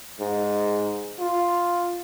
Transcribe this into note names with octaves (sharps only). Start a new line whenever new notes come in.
G#2
F4